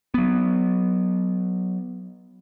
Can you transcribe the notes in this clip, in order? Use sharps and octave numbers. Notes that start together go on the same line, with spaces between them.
F#3 B3